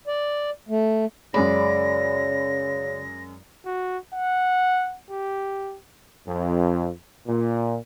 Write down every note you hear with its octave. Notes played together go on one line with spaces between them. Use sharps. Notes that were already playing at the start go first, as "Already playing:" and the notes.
D5
A3
F#2 C#3 G#3 D5 B5 A#6
F#4
F#5
G4
F2
A#2